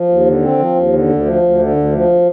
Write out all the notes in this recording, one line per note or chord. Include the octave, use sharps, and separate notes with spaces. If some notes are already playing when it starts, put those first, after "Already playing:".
Already playing: F3
D#2
D3
C4
F3
D#2
D3
D2
F3
D2
D3
D2
F3